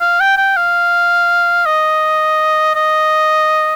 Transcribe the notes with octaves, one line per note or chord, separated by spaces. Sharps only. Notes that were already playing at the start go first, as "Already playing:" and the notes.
F5
G5
G5
F5
D#5
D#5